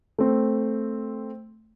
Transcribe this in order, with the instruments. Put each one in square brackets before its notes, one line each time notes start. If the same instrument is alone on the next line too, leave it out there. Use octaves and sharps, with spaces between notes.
[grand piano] A3 C4